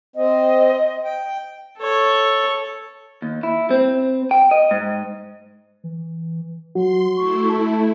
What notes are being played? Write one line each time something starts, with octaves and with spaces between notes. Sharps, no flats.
C4 D#5
G5
A4 C#5
D#2
E4
C4
G5
D#5
G#2
E3
F#3 F#4 C6
A3 E4 C#6
A5